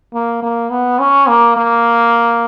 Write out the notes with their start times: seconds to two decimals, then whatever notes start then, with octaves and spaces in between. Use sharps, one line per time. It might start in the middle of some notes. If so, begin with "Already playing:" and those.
0.14 A#3
0.42 A#3
0.70 B3
0.99 C#4
1.28 A#3
1.57 A#3